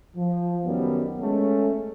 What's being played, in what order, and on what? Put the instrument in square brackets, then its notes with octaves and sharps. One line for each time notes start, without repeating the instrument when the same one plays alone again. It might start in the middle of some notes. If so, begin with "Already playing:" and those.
[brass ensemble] F3
F#2 D#3 F#3 G3 B3
G#3 A3 C#4